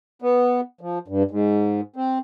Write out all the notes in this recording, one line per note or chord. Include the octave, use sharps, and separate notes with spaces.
B3
F3
G2
G#2
C4